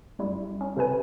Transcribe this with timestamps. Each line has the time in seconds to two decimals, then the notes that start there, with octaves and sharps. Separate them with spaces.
0.19 F#2 G3 E4
0.61 C#4
0.77 C3 A4 B4 G#5